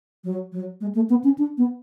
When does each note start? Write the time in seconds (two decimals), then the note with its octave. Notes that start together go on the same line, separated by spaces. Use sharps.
0.24 F#3
0.52 F#3
0.81 G#3
0.95 A3
1.10 B3
1.24 C#4
1.38 D4
1.58 B3